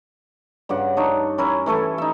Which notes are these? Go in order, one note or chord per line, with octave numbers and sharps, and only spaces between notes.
G2 C#3 D5 F#5
D4 D#4 C#5
C#4 E4 A#4
E3 A3 A4 C#5
D#4 E5